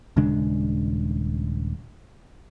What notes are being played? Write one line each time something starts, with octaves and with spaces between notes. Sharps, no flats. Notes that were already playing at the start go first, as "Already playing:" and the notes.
D#1 C#3 G#3 D4